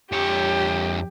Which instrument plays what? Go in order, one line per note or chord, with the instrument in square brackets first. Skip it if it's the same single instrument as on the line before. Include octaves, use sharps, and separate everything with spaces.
[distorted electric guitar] F2 C#5 [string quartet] G4